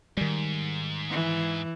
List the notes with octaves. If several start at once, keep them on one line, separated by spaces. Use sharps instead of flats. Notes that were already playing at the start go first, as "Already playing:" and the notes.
G#2 D#3 G3
E3